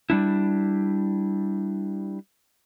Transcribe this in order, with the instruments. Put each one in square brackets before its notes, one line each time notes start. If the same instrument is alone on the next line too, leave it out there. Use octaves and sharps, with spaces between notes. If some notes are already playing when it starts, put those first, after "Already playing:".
[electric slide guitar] G3 D4 E4